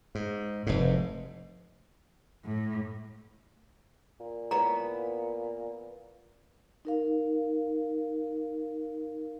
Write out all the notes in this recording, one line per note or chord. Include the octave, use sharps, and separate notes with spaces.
G#2
F1 G#2
A2
A#2
B3 E4 C#5 A#5
D#4 A#4 F5